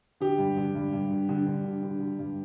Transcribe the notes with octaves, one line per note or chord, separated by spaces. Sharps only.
D3 G4
G2
D3
G2
G2
D3
D3
D3
D3
D3
D3
G2